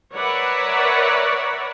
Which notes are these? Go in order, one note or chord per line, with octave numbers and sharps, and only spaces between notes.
A#4 B4 C#5 D5 E5 F#5